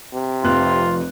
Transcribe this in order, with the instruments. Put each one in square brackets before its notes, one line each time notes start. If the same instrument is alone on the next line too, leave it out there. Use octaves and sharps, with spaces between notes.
[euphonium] C3
[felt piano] F1 F2 F#6 [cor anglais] F4